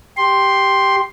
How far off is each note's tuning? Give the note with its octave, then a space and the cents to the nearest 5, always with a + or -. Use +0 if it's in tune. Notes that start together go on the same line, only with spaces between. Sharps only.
G4 +0 C6 +5